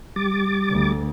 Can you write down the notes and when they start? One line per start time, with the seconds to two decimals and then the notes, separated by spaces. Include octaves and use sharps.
0.16 G3 D6 A6
0.71 D2